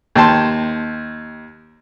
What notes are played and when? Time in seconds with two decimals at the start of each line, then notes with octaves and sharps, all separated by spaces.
0.15 D#2 G5 A5 C6